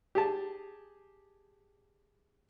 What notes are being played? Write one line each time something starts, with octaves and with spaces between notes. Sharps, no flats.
G4 G#4 A5